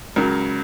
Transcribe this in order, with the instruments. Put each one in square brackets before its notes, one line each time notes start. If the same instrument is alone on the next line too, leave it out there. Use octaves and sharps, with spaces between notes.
[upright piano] C#2 C#3 F#3 A#4